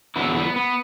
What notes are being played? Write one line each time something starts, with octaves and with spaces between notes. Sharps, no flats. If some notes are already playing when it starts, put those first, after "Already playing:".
E2 D3 F#3 B3 E4
A3
B3
B3